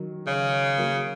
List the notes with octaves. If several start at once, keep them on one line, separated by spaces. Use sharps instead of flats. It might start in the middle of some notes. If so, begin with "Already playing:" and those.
Already playing: D#3 F#3
C#3
F#3 A#3